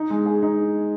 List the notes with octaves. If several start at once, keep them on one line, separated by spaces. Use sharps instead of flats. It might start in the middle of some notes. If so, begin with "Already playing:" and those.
Already playing: D#4
G#3
G#4
D#4